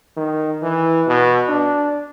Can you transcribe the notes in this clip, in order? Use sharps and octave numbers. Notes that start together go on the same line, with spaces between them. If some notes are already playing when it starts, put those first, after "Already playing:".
D#3
E3
B2
D4